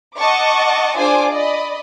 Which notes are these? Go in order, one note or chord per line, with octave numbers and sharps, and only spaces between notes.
D#5 F#5 A5 C#6 D6
D4 F4 G#4 C5 G#5 D6
D5 D#5 B5